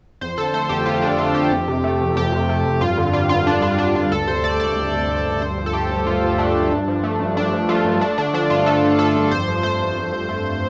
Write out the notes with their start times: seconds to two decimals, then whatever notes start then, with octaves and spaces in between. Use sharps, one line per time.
0.21 F2 C5
0.38 D3 A4
0.54 A3 C5
0.69 F2 G4
0.86 F2 F4
1.02 D3 D4
1.18 A3 F4
1.34 F2 G4
1.51 F2
1.68 C3
1.84 A3
2.00 F2
2.16 F2 G4
2.32 C3
2.49 A3
2.65 F2
2.81 G2 F4
2.97 D3
3.13 G3 F4
3.29 G2 F4
3.47 G2 D4
3.62 D3 F4
3.78 G3 D4
3.95 G2 F4
4.11 D2 A4
4.27 C3 C5
4.43 A3 D5
4.60 D2 D5
4.76 D2
4.93 C3
5.08 A3
5.25 D2
5.41 G2 C5
5.58 F3
5.66 A4
5.73 A3 G4
5.90 G2
6.06 G2 F4
6.23 F3
6.38 A3 D4
6.55 G2
6.72 G2
6.88 F3
7.03 A3
7.20 G2
7.36 G2 D4
7.53 F3
7.69 A3 F4
7.84 G2
8.01 A3 D4
8.18 D3 D4
8.33 F3 D4
8.50 G2 F4
8.66 A3 A4
8.83 D3
8.98 F3 A4
9.15 G2
9.31 F2 C5
9.48 F3
9.63 A3 C5
9.80 F2
9.97 F2
10.12 F3
10.29 A3